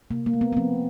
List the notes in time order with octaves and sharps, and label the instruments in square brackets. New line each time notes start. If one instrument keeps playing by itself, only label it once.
[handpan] C3 A#3
A#3
A3
B3
B3
F3 C4